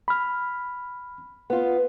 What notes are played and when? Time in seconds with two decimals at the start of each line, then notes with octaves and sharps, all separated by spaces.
0.08 B5 F6
1.50 B3 F4